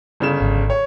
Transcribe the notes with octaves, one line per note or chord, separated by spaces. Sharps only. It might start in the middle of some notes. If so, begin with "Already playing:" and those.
G1 C#3 E7
G#1
C#5